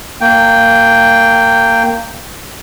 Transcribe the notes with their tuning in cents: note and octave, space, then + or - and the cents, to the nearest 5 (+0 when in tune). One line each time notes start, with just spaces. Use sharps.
A#3 -25 G5 +0